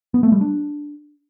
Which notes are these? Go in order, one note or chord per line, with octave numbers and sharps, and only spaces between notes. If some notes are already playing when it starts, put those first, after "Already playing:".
B3
A3
G3
D4